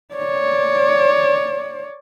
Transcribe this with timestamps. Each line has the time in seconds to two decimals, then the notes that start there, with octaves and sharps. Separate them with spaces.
0.15 C#5 D5